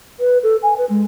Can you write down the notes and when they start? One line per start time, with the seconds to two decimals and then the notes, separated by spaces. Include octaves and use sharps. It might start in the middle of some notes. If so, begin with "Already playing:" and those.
0.20 B4
0.43 A4
0.63 G#5
0.78 B4
0.89 G#3